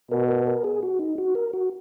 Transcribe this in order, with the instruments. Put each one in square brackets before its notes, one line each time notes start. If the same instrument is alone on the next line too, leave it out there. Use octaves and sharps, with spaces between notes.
[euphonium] B2 [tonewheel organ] A#4
[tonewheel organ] A#4
A#4
G#4
F#4
D#4
F#4
A#4
F#4